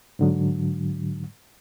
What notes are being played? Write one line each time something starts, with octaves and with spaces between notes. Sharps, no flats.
G#2 D3 F#3